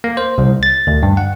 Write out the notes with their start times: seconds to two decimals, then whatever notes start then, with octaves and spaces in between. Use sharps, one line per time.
0.04 A#3
0.17 C5
0.38 C2
0.63 A6
0.87 D2
1.03 G2
1.17 F#5